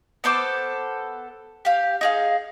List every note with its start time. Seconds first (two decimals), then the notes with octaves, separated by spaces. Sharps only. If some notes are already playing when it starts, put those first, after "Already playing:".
0.24 B3 A4 C5 D6
1.65 G4 F5
2.01 D#4 G#4 F5